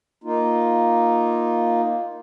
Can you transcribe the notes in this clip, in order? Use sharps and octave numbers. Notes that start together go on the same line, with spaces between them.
A#3 D#4 F4